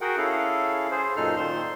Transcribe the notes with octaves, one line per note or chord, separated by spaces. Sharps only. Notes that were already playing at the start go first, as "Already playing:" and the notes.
F#4 G#4 A#4 F#5 G5
C#4 E4 G#4 A4 F5
G#4 C5
F#2 A#2 D#4 A4 F6
A#2 D#3 C5 C6